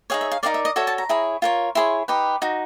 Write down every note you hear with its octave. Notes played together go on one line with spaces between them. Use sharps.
D#4 G#4 C#5 F5
E5
F5
D#4 F#4 A#4 D5 F5
E5
D#5
F#4 A4 C#5 E5
A5
A#5
E4 G#4 C#5
F4 A#4 C#5
E4 G#4 C#5 C6
D#4 G4 B4
D#4 F#4